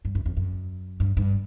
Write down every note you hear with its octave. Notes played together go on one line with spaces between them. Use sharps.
G2
F#2
F2
F#2
G2
G2